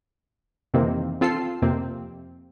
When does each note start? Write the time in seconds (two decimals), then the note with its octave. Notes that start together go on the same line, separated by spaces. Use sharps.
0.74 F2 C3 D#3 E3 A#3 C4
1.21 C4 F4 A4 E6 C7
1.62 F2 C3 A#3 C4